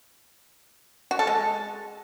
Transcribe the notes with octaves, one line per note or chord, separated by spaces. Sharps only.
F#4
A4
G#3